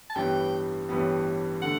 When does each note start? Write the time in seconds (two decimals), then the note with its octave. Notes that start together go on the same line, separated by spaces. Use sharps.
0.10 A5
0.16 A1 G2 E3 G3 B3 G5
0.89 A1 G2 E3 G3 B3
1.62 D3 A3 F#5